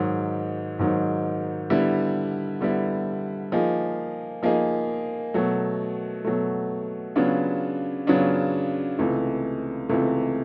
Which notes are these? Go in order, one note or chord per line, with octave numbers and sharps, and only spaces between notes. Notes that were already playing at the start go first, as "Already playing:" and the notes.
Already playing: G#2 D#3 F#3
G#2 D#3 F#3
D3 G3 B3 E4
D3 G3 B3 E4
F3 A#3 D#4 G#4
F3 A#3 D#4 G#4
B2 F#3 A3
B2 F#3 A3
C#3 F#3 B3 D4 F4
C#3 F#3 B3 D4 F4
C#2 C3 E3 A3
C#2 C3 E3 A3